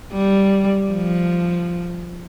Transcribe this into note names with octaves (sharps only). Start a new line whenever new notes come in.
G3
F3